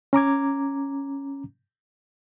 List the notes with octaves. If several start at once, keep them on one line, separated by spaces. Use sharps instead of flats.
C#4 A#5 D6 G#6